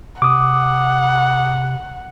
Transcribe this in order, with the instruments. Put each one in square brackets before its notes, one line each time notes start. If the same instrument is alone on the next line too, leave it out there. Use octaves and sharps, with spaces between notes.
[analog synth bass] C3 [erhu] F#5 [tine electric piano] D6 D#6